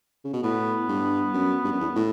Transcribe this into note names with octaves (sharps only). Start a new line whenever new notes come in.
C#3
B2
A2 B3
G2
F#2
G2
F#2
E2
A2